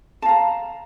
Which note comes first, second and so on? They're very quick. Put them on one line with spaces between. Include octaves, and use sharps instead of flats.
A5 F5 A#5